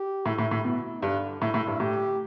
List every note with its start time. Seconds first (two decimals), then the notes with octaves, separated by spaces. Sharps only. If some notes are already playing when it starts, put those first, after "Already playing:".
Already playing: G4
0.26 A2 E4
0.38 A2
0.51 A2
0.65 B2 E4
1.02 G2 D3
1.41 A2 E4
1.54 A2
1.67 G2
1.80 A2 G4